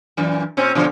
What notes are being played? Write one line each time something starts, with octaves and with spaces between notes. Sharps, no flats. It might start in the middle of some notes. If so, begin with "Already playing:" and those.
F#2 A#2 E3
A#2 C4 C#4
B2 D3 F3